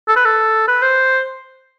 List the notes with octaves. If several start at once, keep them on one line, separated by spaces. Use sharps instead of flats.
A4
B4
A4
B4
C5